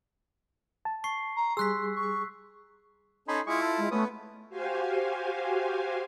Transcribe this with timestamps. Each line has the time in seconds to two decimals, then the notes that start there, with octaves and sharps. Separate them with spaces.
0.85 A5
1.04 C#6 C7
1.36 A#5
1.57 G3 G#4 C6 E6 F#6 B6
1.96 C#6
3.28 C#4 D#4 A4 G#5 B5 C6
3.47 G#3 E4 F4 G#4 C#6
3.62 A4
3.78 G#3
3.91 A3 B3 C#4 B4 D#6
4.49 F#4 G4 C5 F5 G#5